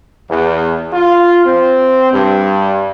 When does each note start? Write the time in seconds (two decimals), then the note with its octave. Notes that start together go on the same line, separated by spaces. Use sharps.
0.30 E2
0.93 F4
1.46 C4
2.12 G2